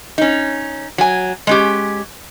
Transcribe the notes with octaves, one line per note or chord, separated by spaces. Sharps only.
C#4 D#4
F#3 G#5
G#3 C#4 G4